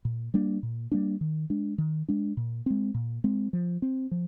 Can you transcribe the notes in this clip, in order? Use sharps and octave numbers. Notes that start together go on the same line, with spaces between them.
A#2
G3 A#3 D4
A#2
G3 A#3 D4
D#3
G#3 D4
D#3
G#3 D4
A#2
G#3 C4
A#2
G#3 C4
F3
C4
F3